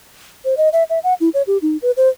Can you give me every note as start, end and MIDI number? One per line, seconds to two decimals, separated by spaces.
0.45 0.54 72
0.57 0.69 75
0.73 0.83 76
0.90 0.99 76
1.04 1.14 78
1.20 1.29 64
1.34 1.42 73
1.47 1.58 67
1.62 1.77 63
1.82 1.91 71
1.97 2.09 72